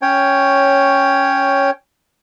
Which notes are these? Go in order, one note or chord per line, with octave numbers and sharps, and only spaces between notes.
C#4 C#5 G5